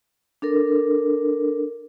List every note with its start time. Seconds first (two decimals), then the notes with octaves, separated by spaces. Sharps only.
0.42 D4 A4 A#4